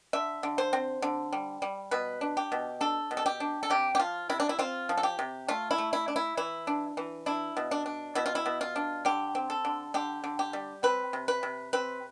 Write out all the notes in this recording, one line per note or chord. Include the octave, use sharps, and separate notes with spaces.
D3 E5
D3
C5
C4
D3
G3
G3
B2 B4
D4
G4
B2
D4 A4
B2
A4
G4
D4
A4
C3 G4
G4
F3 F4
C3 E4
D4
E4
C4 F4
F3
A4
G4
C3
A3 F4
E4
A3
E4
D4
E4
E3 E4
D4
E3
D4 E4
B2
D4
D4
B2 E4
F4
E4
B2
F4
D4
D3 G4
C4
A4
D3
D3 G4
D3
G4
G3
C4 B4
C3
B4
C3
C4 B4